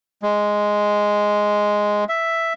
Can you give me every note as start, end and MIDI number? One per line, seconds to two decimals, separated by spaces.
0.23 2.04 56
2.09 2.53 76